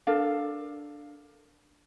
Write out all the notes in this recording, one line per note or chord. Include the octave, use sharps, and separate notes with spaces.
D4 A4 A#4 F5